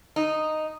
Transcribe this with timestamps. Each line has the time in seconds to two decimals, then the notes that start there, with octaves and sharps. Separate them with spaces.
0.16 D#4